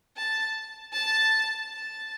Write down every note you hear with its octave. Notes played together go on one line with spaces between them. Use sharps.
A5
A5
A5